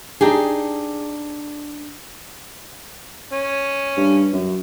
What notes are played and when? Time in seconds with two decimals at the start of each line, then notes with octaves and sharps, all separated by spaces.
0.21 D4 D#4 G4 G#4
3.33 C#4
3.97 G2
4.33 F#2